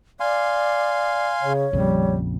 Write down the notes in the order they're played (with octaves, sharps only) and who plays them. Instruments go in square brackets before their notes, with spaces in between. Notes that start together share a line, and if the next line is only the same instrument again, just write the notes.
[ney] D5 [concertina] F5 G#5 C6
[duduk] C#3 [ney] C#5
[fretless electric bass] A#1 F2 C#3 [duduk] G3